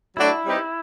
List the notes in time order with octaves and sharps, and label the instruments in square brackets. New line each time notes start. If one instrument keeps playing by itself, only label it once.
[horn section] F#3 A3 D4 F#4 [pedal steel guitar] E4
[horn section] G3 C4 D#4 G4 B4